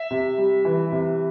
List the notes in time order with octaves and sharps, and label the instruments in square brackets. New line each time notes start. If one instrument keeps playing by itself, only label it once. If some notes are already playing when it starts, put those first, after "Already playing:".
Already playing: [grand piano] E5
C3
G3
E3
C3